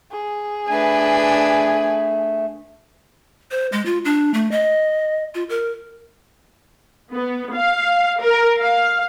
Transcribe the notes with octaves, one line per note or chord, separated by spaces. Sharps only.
G#4
A3 D4 B4 G#5
C5
G#3
F4
D4
A3
D#5
F4
A#4
B3
F5
A#4
F5